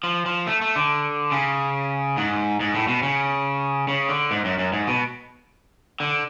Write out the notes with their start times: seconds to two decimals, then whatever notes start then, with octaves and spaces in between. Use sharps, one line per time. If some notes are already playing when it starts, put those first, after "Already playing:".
0.04 F3
0.26 F3
0.47 A3
0.61 A3
0.76 D3
1.32 C#3
2.17 G#2
2.60 G#2
2.74 A2
2.88 B2
3.03 C#3
3.88 C#3
4.09 D3
4.31 G#2
4.45 F#2
4.58 F#2
4.73 G#2
4.87 B2
6.00 D3